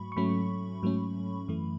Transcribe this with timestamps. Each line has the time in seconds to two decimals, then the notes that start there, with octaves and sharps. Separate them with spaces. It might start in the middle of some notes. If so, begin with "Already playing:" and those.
Already playing: G#2 F#3 A3 B5 C#6
0.12 C#6
0.16 G#2 F#3 A3 C#4 B5
0.83 G#2 F#3 A3 C#4
1.48 F#2 E3 A3